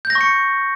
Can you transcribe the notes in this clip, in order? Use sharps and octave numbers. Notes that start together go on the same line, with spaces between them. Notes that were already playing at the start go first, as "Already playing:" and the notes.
G6
A#6
C#6
C#7